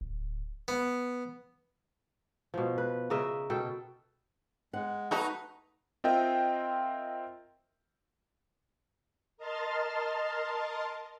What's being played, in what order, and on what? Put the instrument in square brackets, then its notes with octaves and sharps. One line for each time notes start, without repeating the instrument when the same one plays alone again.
[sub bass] D1
[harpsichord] B3
[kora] B2 F3
B4
C#3 A#4 D#5 E5
B2 A4 G5
[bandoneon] G#3 [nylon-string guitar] F#5
[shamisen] F#3 F#4 A5 [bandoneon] A3 B4 [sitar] D#4
[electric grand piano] C4 F4 A#4 D#5 E5 G5
[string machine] A#4 D#5 A5 C6 F6 A6